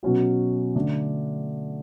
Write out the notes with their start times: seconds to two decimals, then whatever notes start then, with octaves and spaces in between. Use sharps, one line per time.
0.03 B2 F#3 C#4 F#4
0.75 D3 A3 D4